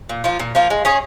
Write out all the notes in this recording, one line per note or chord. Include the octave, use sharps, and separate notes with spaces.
A#2
F3 A#3 F4
A#2
F3 A#3 F4
G#3
C#4 G#4 C#5